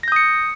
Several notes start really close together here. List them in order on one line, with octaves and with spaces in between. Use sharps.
A#6 G6 D#6 C#7